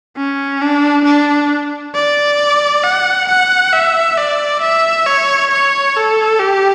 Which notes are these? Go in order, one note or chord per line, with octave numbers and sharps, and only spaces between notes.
C#4
D4
D4
D5
F#5
F#5
E5
D5
E5
C#5
C#5
A4
G4